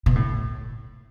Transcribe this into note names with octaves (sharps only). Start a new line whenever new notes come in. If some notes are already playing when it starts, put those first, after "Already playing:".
B2
A2